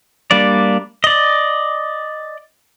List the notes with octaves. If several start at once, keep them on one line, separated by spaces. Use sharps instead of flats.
G3 A#3 D4 D5
D5 D#5